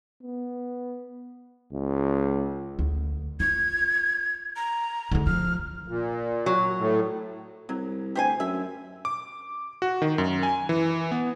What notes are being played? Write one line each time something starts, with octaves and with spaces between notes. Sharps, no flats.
B3
C#2
D2
F4 G#6
A#5
D3 G#3
F3 F6
A#2
F#3
A2
C2 F#3
D2 G4 C5 G#5
F#2 E5
D6
F#4
D#3
F#2
G#5
E3
B3